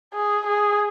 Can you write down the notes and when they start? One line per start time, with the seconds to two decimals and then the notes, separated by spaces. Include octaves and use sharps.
0.14 G#4
0.46 G#4